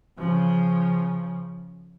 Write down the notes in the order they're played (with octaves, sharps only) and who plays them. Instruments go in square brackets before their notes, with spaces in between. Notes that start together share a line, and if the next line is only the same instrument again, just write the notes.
[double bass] C#3 F3